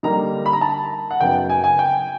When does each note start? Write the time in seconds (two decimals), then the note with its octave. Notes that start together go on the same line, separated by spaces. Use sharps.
0.03 D3 G3 A#3 D#4 A#5
0.46 B5
0.53 A#5
0.61 A5
1.11 F#5
1.20 F#2 C#3 F#3 B3 D#4 G5
1.50 G#5
1.64 G#5
1.79 G5